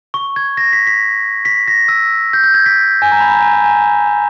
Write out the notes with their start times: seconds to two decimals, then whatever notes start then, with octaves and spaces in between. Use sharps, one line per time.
0.14 C#6
0.36 G#6
0.57 A#6
0.73 B6
0.87 B6
1.45 B6
1.68 A#6
1.88 E6
2.33 G6
2.44 G6
2.54 G#6
2.66 B6
3.02 G#5
3.12 A#5
3.21 B5
3.31 A#5
3.42 G#5
3.54 A#5
3.64 G#5
4.07 A#5